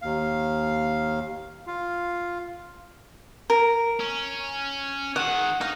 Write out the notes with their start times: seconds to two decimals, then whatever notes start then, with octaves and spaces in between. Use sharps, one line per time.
0.02 D#2 F5
1.67 F4 F5
3.50 A#4
4.00 C#4
5.16 D#3 G#3 F#5
5.61 D#4 F5